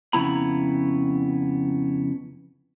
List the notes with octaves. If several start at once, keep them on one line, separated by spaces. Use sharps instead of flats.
F2 C#3 B3 E4 A#5 B5